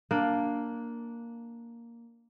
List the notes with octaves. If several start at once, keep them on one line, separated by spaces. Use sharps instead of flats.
A#3 D4